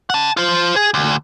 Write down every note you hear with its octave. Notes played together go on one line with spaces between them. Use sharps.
F#5 A5
F4 C5
G#4
D2